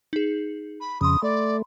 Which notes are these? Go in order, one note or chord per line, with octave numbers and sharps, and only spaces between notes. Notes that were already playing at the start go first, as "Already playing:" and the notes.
D#4 G#4
B5
F2 C#3 B5 C6 D#6
A3 D5